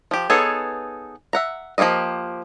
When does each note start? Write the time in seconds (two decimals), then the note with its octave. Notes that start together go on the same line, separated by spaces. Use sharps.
0.11 F3 G4
0.30 B3 D#4 G#4 A4 C#5
1.33 E5 F#5 A#5
1.78 F3 A#3 F4 G4 D#5